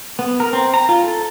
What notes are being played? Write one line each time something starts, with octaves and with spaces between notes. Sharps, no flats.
B3
A#4
C4
A#5
F4
A4